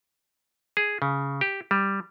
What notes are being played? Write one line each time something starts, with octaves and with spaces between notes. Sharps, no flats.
G#4
C#3
G4
G3